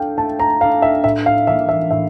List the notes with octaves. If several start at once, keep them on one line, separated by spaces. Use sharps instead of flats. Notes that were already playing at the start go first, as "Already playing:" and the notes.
Already playing: D4 A4 F5 G5
A3 A5
A#5
D4 A4 F5
E5
A2 E5
F5
E3 G3 A#3 D4 E5
E5
A2 E5